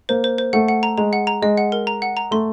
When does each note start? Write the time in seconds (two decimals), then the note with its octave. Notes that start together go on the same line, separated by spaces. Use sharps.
0.09 A#3 C5
0.24 C5
0.38 C5
0.53 A3 F#5
0.68 F#5
0.83 A#5
0.98 G#3 A#5
1.13 F#5
1.27 A#5
1.42 G#3 D#5
1.58 F#5
1.72 A#4
1.87 A#5
2.02 F#5
2.17 A#5
2.31 A3 C6